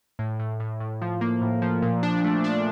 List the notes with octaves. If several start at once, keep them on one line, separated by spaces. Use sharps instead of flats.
A2
A2
A2
A2
F3
A#3
A2
F3
A#2
D4
A3
D4